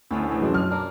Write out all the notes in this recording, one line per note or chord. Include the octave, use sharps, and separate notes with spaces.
D2 D3 C#4 E4
C#3 E3
F#2 B2 G#3 D4 F4
F6
A#3 D4